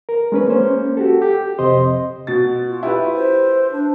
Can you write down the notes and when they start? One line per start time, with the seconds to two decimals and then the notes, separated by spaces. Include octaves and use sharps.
0.09 A#4
0.32 G#3 C#4 B4
0.48 A#3 C#4 C5
0.97 F#4 G4 A4
1.22 G4
1.59 F2 C3 C5 D#5 C6
2.27 B2 A6
2.68 F4
2.83 E4 G4 B4
3.14 C5
3.72 D4